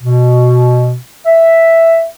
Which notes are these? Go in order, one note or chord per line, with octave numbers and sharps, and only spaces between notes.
B2
E5